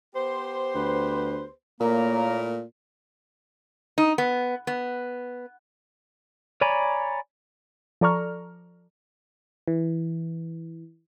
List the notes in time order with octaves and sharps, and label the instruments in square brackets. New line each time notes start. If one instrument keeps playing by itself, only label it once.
[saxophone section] B3 G4 C5
[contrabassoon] D2 [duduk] B4
[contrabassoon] A#2 [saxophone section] A3 E4 A#4 [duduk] A#3 [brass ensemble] C#5 A#5
[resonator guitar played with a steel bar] D#4
B3
B3
[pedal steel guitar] C#5 D5 G#5 A#5 B5
[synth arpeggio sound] F3 A4 D5 A#5 C#6 F6
[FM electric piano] E3